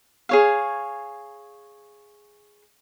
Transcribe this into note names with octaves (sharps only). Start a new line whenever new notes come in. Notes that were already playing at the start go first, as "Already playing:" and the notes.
G#4 C#5 F5